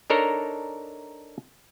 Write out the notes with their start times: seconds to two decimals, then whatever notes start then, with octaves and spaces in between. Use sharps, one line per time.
0.10 D4 D#4 A4 A#4 C#5 A#5